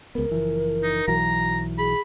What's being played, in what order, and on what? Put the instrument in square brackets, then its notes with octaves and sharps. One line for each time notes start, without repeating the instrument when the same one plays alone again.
[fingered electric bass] C#2 B3 [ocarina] A#4
[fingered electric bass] F#1 E3 F3
[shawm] D#4
[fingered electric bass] B1 E3 F#3 [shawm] A#5
[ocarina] G#4 [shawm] B5